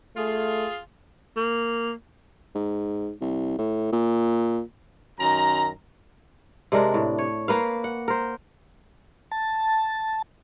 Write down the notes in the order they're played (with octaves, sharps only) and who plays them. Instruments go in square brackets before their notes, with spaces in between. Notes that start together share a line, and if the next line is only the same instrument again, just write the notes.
[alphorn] A3 [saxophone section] F4 G#4
[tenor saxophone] A#3
[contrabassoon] G#2
C2
A2
A#2
[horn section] F#2 D#3 A#5
[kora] C3 G#3 D4 A#4
A2
C#5
A#3 B4 F5
F#5
A#4 C5
[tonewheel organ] A5